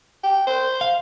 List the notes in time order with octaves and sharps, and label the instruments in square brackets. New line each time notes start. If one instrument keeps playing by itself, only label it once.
[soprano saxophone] G5
C5
[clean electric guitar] F5